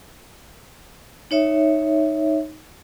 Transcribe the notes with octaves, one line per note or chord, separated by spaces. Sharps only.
D#4 C#5 E5